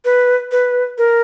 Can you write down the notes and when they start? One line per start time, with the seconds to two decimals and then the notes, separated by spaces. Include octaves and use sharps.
0.05 B4
0.52 B4
0.98 A#4